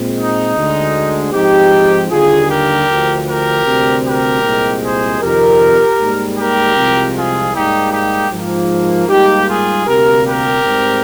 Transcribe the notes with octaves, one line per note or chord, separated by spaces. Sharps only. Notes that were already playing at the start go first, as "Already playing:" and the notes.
Already playing: A#2 G#3 C4
D#4
D2 D3 G#3
G#2 F3 C4 D#4 G4
D#2 D3 G3 A#3 F4 G#4
G4 A#4
D2 D3 F3
G4 A#4
D2 C3 G3 C4
G4 A#4
C2 A#2 G#3 C4
G#4 C5
F2 C3 D#3 G4 A#4
G#2 G3 A#3
G4 A#4
C2 C3 F3 G#3 C4
F4 G#4
G#2 G3 A#3 D#4 G4
D#4 G4
G#2 F3 A#3
G#2 G3 A#3 D#4 G4
F4 G#4
D2 C3 G3 A#3 G4 A#4
G4 A#4
G#2 G3 C4